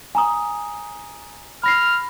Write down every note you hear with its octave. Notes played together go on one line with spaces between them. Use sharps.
G#5 A#5 D#6
B5 F6 A#6 C7